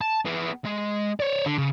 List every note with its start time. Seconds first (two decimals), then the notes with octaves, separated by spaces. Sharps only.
0.01 A5
0.26 B3 G#4
0.66 G#3
1.20 C#5 D5
1.46 D3
1.58 C#3